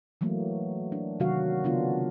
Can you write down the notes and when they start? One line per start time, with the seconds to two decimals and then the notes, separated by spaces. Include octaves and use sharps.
0.21 E3 F#3 A3 A#3
0.92 D4
1.20 C3 D#3 F#3 F#4 F5
1.64 C#3 B3 D4 F4